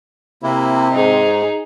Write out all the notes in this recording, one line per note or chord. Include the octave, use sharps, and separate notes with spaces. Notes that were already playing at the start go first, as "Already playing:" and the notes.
C3 A#3 E4
G#2 D#4 G#4